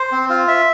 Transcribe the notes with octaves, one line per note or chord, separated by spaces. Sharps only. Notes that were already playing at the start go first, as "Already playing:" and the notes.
Already playing: C5
C4
F4
E5